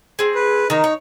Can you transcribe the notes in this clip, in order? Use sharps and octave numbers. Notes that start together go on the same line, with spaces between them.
C4 G#4
B4
D#3 D#4 A#5
C#5